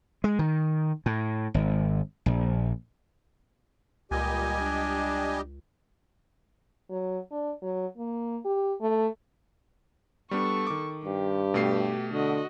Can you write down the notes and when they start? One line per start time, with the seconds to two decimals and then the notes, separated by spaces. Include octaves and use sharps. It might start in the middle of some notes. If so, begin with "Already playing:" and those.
0.24 G#3
0.39 D#3
1.06 A2
1.54 G#1
2.26 A#1
4.11 C#2 A#2 G3 G4 D#5 G#5
4.60 D4
6.90 F#3
7.31 D4
7.62 F#3
7.97 A#3
8.45 G4
8.81 A3
10.31 G3 B3 D4 A4 C#6
10.67 D#3 D6
11.05 G2 G4
11.54 B2 A3 C7
12.13 D3 F#4 D#5